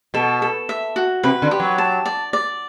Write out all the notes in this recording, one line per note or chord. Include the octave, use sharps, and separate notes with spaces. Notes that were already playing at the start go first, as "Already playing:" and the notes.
B2 A4
A4
E5
F#4
C3 B4
D3
G4
F#3
A5
D5
D5